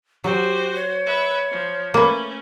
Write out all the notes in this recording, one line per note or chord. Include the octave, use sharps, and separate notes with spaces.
F#3 F#4 G4 C5
C#5
B4 E5
F3
A3 A#3 C#4 B4